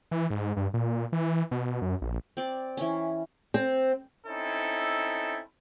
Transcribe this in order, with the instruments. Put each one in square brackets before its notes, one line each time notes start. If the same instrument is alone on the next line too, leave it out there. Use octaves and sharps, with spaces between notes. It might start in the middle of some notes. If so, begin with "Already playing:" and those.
[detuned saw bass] E3
G#2
G2
A#2
E3
B2
F#2
A#1
[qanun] C4 D5
E3 C#4
[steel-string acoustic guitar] C4
[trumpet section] C4 C#4 D#4 E4 A4